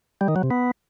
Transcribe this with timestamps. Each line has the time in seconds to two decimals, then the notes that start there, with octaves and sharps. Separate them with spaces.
0.21 G3
0.28 D#3
0.36 F#3
0.43 C3
0.51 B3